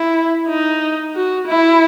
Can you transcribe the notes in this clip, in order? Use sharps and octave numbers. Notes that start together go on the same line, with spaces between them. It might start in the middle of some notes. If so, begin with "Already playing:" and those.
Already playing: E4
D#4
F#4
E4